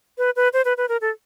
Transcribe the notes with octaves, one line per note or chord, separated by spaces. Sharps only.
B4
B4
C5
B4
B4
A#4
A4